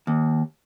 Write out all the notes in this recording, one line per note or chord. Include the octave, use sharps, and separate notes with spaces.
D#2